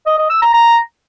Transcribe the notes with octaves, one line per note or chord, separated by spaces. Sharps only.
D#5
D#5
E6
A#5
A#5